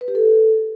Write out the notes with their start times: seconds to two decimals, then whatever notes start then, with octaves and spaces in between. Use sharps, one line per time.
0.01 B4
0.08 G4
0.15 A4